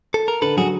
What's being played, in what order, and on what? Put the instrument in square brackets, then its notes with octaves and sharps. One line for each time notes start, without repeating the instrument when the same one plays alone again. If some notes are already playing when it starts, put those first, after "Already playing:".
[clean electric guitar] A4
A#4
[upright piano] D3 [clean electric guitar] A4 B4
[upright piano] F#3 [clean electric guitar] F#4 G#4